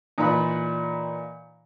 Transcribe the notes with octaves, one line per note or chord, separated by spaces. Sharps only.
A#2 E3 D#4 F4 B5 F#6